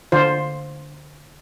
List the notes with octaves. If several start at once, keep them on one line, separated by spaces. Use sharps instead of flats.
D3 F4 C5